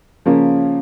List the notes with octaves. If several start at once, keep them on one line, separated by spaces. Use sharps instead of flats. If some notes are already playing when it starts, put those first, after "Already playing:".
C#3 F3 A#3 C#4